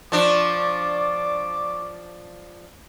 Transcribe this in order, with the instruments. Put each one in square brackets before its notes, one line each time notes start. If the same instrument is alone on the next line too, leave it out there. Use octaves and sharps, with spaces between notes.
[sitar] F3 D4 [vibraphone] D5 C#6 [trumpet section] D6